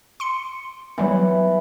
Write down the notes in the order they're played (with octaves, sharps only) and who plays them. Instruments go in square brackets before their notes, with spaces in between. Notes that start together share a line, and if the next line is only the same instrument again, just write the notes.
[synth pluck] C6 C#7
[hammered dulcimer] E3 [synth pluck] F#3 G3 B3